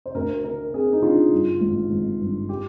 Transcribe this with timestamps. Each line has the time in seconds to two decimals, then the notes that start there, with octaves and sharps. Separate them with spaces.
0.06 C5
0.15 D2 A#4
0.44 D3 A#4
0.73 C4 G#4
0.93 D#4
1.03 D3 F4
1.32 G2
1.61 G#1
1.90 G#1
2.20 G2
2.49 G4